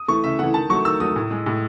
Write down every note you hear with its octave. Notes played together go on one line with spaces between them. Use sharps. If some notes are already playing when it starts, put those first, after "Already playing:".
Already playing: D#6
E3 A3 C#6
C#3 E5
E3 A3 F#5
D#3 A5
F#3 A3 C#6
D#3 E6
F#3 A3 D#6
A2
G#3
A2